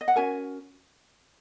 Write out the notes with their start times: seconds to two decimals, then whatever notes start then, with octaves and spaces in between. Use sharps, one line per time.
0.01 D#5
0.08 F#5
0.16 C#4 F#4 A#4 G#5